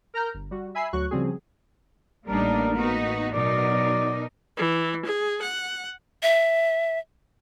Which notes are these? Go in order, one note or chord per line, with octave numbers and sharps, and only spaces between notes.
A#4 A#5 F6 G6
G1
G3 F#4
E5 G#5 B5 E6 C7
D2 F#3 F#4 C#6 F#6
C#3 F3 G3 C4 F#4 G#4
A1 G3 A#3 D4 D#4 A#4
B3 D#4 F#4
B2 F#3 D#4 A#4 D5
E3
G#4
F#5
E5